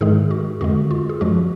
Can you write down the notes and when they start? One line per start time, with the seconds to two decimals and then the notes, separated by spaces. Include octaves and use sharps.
0.01 G#2 D#3 G#3 G#4
0.31 F#4
0.61 F2 D3 G#3 F#4
0.91 F4
1.09 G#4
1.21 F#2 F3 G#3 F#4